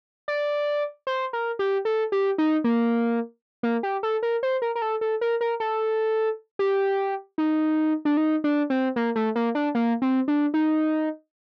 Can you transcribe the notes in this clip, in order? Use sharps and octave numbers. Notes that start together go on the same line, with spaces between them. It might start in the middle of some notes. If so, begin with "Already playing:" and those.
D5
C5
A#4
G4
A4
G4
D#4
A#3
A#3
G4
A4
A#4
C5
A#4
A#4
A4
A4
A#4
A#4
A4
G4
D#4
D4
D#4
D4
C4
A#3
A3
A#3
D4
A#3
C4
D4
D#4